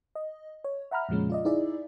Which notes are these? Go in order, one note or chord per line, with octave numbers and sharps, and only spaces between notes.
D#5
C#5
E5 F#5 A#5 B5 F6
F2 A#2 C#3 F3 G#3 C#4
F4 D5 D#5
D#4 E4 G#4 D5 E5